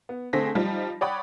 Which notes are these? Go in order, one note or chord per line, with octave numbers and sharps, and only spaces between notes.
B3
D3 A3 C4 G#4 A#6 B6
F3 G3 D#4 F4
C#5 D5 F#5 G5 B5 D#6